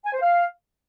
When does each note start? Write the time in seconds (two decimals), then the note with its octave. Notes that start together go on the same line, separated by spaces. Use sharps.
0.05 G#5
0.13 C5
0.21 F5